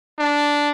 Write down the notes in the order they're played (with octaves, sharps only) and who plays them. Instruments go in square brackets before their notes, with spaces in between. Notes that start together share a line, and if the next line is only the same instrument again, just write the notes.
[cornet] D4